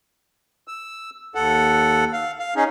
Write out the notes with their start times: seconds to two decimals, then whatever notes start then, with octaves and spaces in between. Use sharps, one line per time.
0.68 E6
1.35 D#2 A4 F#5
2.13 F5
2.39 F5
2.56 C#4 D#4 G#4